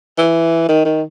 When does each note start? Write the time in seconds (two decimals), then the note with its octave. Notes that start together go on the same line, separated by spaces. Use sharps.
0.18 E3
0.69 D#3
0.85 D#3